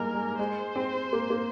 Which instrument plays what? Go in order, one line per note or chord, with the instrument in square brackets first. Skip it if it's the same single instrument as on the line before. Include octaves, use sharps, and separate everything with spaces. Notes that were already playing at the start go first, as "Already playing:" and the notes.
Already playing: [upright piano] G3 G#3 A#3 [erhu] A#4
[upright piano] G#3
[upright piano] G#3 [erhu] C5
[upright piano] C4
A#3
A#3